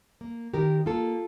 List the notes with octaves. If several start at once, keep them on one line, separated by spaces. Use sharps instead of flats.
A#3
D#3 G4 A#4
A#3 F4 A4